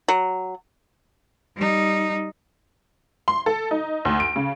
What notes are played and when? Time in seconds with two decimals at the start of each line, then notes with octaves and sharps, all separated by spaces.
0.08 F#3
1.56 G3 D#4
3.28 C6
3.46 A4
3.71 D#4
4.05 D2
4.20 D7
4.36 C#3